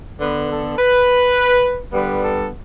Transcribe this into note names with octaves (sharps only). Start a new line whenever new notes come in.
D3 B3 B4
A4
B4
D3 G3 B3 B4
A4